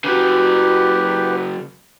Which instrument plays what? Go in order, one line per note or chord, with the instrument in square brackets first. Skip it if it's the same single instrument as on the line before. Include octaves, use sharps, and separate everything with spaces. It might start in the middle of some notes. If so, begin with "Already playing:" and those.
[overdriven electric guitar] C#3 F#3 [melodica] G4 B4